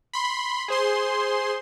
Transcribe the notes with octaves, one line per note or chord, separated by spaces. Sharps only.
B5 C6
G#4 C5 C6